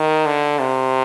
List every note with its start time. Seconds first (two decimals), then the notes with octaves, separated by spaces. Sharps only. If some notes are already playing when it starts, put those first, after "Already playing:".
Already playing: D#3
0.26 D3
0.59 C3